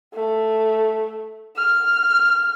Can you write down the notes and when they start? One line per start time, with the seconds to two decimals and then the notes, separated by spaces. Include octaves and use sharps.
0.14 A3
1.56 F6